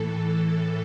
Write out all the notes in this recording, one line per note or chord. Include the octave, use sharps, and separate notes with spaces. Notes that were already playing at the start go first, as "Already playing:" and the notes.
Already playing: A2 E3 A4